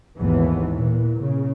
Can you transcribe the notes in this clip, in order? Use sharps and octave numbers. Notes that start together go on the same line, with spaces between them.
G#1 D#2 G#2 E3 B3
A#2 E3
C#3